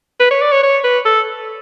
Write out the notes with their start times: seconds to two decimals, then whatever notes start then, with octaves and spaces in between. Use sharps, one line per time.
0.20 B4
0.31 C#5
0.42 D5
0.52 C#5
0.63 C#5
0.84 B4
1.05 A4